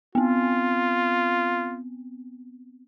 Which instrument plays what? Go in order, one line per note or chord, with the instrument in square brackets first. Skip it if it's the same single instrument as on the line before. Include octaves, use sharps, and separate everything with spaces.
[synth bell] B3 C4 [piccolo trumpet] F4